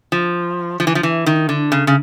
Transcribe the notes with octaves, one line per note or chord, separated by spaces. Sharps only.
F3
F3
E3
F3
E3
D#3
D3
C#3
C#3